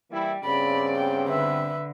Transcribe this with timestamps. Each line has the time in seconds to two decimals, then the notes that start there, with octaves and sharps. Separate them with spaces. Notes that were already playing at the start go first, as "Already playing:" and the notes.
0.11 E3 G3 A#3 E4
0.45 G2 C#3 B3 C4 D5 B5
0.96 G5
1.28 D3 B4 E5